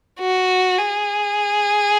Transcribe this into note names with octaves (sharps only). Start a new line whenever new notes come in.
F#4
G#4